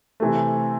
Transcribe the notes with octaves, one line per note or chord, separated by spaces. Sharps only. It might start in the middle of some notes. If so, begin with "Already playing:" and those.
C3 E3 A3